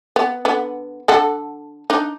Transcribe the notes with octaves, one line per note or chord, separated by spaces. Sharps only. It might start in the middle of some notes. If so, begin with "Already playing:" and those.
B3
D3 B3
D3 A4 F#5
D4 D#4